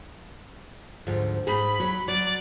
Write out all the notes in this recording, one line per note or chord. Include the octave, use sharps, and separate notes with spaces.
D2 G#2 F3
G#2 D#4 G#4 B5
F#3
F#3 D5